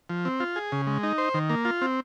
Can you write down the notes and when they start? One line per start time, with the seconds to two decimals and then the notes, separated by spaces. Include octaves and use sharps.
0.10 F3
0.25 C4
0.40 F4
0.56 G#4
0.72 C#3
0.87 G#3
1.03 D#4
1.18 C5
1.34 D#3
1.50 A#3
1.65 F4
1.82 C4